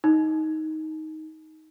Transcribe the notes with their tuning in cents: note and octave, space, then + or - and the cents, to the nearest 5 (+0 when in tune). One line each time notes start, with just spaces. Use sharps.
D#4 +10